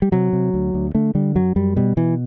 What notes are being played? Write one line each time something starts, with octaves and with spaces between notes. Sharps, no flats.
G3
C3 F#3
C3
D2
D2
D3 A3
D3 G3
F#2 F#3
F#2 G3
B2 G3
B2 E3